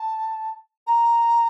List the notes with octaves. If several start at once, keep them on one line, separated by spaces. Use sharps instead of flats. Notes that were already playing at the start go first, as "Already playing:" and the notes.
Already playing: A5
A#5